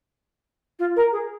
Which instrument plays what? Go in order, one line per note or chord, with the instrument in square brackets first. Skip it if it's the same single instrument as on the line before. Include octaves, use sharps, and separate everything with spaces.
[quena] F4
A#4
G#4